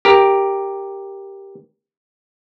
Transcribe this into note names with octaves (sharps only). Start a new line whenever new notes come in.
G4 A#4